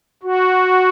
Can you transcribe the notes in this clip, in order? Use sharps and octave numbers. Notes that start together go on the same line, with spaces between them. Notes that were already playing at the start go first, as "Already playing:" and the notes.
F#4